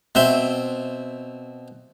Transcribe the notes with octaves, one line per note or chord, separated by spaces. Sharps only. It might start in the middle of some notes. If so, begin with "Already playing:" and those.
B2 C4 E5 C6